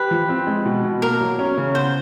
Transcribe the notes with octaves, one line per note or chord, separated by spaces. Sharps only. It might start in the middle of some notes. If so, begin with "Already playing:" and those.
Already playing: G4 B4
F3
C4
G#3
B2
B2
A#3 A#4
F#3
C#4
C#3
B3 C5